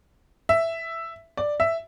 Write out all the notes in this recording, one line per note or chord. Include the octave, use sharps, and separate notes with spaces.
E5
D5
E5